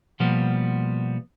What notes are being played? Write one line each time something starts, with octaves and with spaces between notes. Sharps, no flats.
B2 F3 G3 A#3 B3